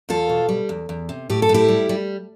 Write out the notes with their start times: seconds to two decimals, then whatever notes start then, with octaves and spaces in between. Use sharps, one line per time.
0.09 E2 F4 A4
0.29 B2
0.49 G3
0.69 E2
0.89 E2
1.09 C3
1.30 A2 G4
1.42 A4
1.49 A2
1.54 E4 G4
1.68 G3
1.89 G3